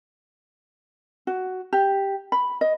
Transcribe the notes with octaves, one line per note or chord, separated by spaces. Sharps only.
F#4
G4
B5
D#5